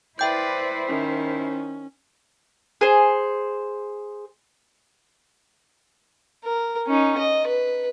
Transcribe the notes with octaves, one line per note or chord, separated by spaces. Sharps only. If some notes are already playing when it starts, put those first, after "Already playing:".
E4 B4 C5 D5 E5 G5 G6
D#3 C#4
G#4 C5
A#4
C#4 D#4
D#5
B4